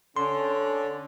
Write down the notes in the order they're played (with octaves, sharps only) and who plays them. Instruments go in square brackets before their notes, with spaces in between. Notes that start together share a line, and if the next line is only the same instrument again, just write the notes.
[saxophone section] D3 [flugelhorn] C#4 [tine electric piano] C6